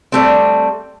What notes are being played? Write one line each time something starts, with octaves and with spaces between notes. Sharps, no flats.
G3 A3 C4